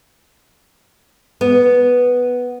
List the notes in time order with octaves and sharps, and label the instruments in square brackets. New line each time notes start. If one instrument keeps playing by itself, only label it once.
[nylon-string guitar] B3